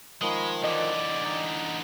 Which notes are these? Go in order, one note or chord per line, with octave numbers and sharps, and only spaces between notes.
D#3 F3 G#3 B5 D#6
D3 E3 D5 D#5
D#4